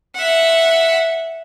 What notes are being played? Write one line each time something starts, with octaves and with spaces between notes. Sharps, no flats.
E5 F#5